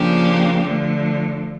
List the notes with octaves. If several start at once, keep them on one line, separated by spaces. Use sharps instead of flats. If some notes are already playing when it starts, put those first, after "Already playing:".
Already playing: C#3 F3 A#3 D4 G4
D3 F3 A3